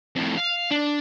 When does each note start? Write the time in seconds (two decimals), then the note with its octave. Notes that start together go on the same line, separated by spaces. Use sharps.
0.16 F2 A2
0.37 F5
0.71 D4